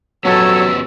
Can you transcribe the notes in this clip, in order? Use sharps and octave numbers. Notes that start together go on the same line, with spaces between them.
F#3 B3 C#4 G4 A4 C#5 E6